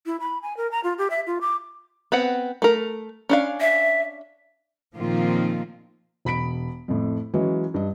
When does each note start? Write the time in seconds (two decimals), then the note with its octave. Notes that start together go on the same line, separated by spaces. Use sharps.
0.06 E4
0.20 B5
0.42 G#5
0.57 A#4
0.72 A#5
0.84 F4
0.98 G4
1.10 E5
1.27 F4
1.41 D6
2.12 B3 C4 F#5
2.62 A3 A#4
3.29 C#4 D4 F5
3.61 E5
4.95 A#2 D#3 F3 A#3 C4 F4
6.25 E1 B5 B6 D7
6.88 F2 A2
7.34 E3 F#3 G#3 C#4
7.74 G2 D#5